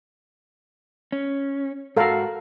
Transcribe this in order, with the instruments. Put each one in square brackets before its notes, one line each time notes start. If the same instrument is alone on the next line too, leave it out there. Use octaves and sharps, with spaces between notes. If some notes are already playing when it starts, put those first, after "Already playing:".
[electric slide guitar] C#4
[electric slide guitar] G#2 F#4 [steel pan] A4 A#4 F5